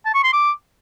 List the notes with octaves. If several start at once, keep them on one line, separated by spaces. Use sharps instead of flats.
A5
C#6
C6
D6